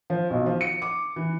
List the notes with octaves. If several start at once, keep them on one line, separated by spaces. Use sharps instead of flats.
F3
B1
F3
C#7
D6
E3